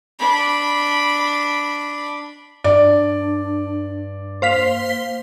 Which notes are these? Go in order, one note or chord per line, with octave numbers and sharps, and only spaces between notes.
D4 B5
G2 D4 D5
A#3 C5 F5 B6